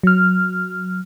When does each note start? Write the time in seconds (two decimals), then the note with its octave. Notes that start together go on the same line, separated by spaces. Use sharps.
0.03 F#3 F6